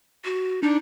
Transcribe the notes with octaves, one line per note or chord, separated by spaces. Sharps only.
F#4
D4 D#4